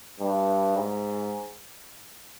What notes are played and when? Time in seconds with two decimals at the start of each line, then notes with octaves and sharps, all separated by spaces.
0.20 G2
0.77 G#2